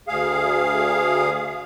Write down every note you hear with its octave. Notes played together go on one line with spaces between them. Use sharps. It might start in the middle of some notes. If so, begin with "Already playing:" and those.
D2 G#4 F5